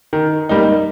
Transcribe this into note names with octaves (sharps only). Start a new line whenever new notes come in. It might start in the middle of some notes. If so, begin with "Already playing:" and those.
D#3
G3 A#3 D#4